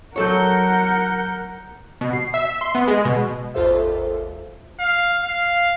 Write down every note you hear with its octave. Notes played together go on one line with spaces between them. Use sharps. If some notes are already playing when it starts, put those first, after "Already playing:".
F#3 A4 A#4 C#5 F#5 G6 C#7
B2
C7
E5
C6
B3
G#3
B2
G#1 D#2 F4 A4 C5 E5
F5
F5